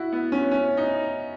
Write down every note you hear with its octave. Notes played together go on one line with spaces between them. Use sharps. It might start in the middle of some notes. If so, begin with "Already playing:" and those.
Already playing: E4 F#4
B3
C#4
C#4
D#4